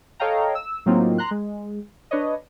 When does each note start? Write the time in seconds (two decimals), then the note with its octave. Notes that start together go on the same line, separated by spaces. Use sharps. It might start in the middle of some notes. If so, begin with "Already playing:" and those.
0.20 A4 C#5 D#5 F5 G5 A#5
0.55 E6
0.86 A2 F#3 A#3 C4 D#4 F4
1.18 A#5 C6 F#6
1.31 G#3
2.11 D4 B4 C#5 D#5